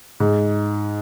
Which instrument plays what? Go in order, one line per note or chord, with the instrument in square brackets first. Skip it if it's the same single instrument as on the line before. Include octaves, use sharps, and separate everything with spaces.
[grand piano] G#2